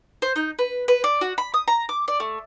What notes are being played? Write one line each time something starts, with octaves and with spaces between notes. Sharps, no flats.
C5
D#4
B4
B4
D5
F#4
B5
D#6
A#5
D6
D5
A3